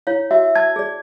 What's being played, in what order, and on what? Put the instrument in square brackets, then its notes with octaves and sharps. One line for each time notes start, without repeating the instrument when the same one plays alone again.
[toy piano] E4 C#5 F5
[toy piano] F#4 [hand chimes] E5
[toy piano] A5 [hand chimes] G#6
[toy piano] G#4 D5